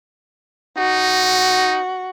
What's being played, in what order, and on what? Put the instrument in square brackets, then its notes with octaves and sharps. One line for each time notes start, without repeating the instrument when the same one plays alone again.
[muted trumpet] D#4 [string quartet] F#4